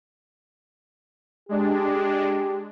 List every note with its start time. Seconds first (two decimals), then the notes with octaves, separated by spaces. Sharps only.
1.49 G#3 D4 G4